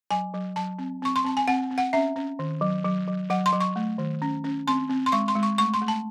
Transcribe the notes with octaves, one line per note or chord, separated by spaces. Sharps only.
F#3 G#5
F#3
F#3 A5
C4
C4 C#6
C6
C4 A5
G#5
C4 F#5
C4
F#5
C#4 E5
C#4
D#3
F#3
F#3
F#3
F#3 F#5
C6
F#3
C#6
A3
D#3
C#4
C#4
C4 C6
C4
C6
G#3 C#6
C6
G#3
C#6
A3 C#6
C6
A3
A5